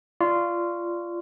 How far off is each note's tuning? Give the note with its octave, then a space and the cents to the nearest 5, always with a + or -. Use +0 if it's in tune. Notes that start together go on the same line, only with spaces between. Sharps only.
F4 -15 D5 +0 C#6 +0